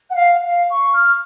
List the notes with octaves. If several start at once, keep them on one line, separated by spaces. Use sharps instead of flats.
F#5
F5
F5
C#6
F6